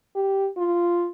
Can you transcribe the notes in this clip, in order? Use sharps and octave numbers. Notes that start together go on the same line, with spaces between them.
G4
F4